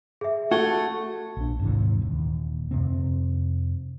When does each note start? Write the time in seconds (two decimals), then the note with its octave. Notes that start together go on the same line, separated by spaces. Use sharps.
0.21 G#4 E5
0.51 A3 F#4 G#6 G7
1.37 A#1 D4
1.59 D#2 G#2 C3 E3
2.02 D#1 D#2
2.71 F2 C3 C4